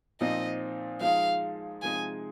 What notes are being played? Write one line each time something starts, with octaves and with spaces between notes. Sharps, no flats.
A#2 F3 C4 D#4 D#5
F3 G#3 D#4 G#4 F5
C3 F3 G#3 D#4 G#4 G#5